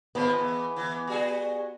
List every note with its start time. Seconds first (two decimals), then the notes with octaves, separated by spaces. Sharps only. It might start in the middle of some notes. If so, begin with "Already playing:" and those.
0.15 D#3 F3 G#3 B3
0.39 E3
0.76 E3
1.07 G3 F#4 G#4